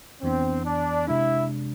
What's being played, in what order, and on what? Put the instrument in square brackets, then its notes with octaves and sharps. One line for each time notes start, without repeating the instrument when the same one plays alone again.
[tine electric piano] F2 E3 B3 D4 [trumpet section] C4
[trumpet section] D4
[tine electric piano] C3 G#3 D4 [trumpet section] E4